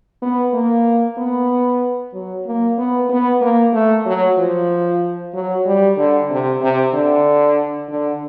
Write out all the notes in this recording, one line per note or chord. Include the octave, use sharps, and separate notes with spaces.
B3
A#3
B3
F#3
A#3
B3
B3
A#3
A3
F#3
F3
F#3
G3
D3
C3
C3
D3
D3